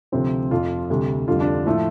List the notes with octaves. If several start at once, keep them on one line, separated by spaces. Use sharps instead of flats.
D2 C3 F3 C4
F1 F2 F3 F4
D2 C3 G3
F2 D3 G3 F4
D4
A2 F3 A3